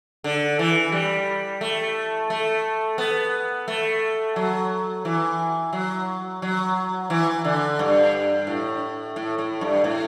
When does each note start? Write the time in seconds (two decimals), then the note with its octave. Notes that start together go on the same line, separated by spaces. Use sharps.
0.24 D3
0.59 E3
0.92 G3
1.61 A3
2.30 A3
2.98 B3
3.68 A3
4.36 F#3
5.05 E3
5.73 F#3
6.42 F#3
7.10 E3
7.45 D3
7.79 G2
8.47 A2
9.16 A2
9.38 A2
9.61 G2
9.84 A2